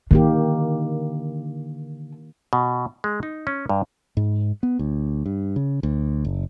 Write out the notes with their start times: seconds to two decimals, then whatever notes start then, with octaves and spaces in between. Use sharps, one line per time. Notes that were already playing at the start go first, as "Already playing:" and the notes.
0.11 D3 D#3 A#3 G4
2.53 B2
3.04 G#3
3.23 D#4
3.47 C#4
3.69 G2
4.17 G#2
4.63 B3
4.79 D2
5.26 G2
5.56 C#3
5.83 D2
6.25 F#1